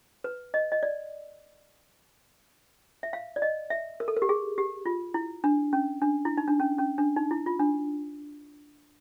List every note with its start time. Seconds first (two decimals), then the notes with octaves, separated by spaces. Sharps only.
0.24 B4
0.54 D#5
0.72 D#5
0.83 D5
3.03 E5
3.13 F5
3.36 D5
3.42 D#5
3.70 E5
4.00 A#4
4.08 A4
4.17 A#4
4.22 G4
4.29 G#4
4.58 G4
4.86 F4
5.14 E4
5.44 D4
5.73 C#4
6.02 D4
6.25 E4
6.37 D#4
6.48 D4
6.60 C#4
6.78 C#4
6.98 D4
7.16 D#4
7.31 E4
7.46 F4
7.59 D4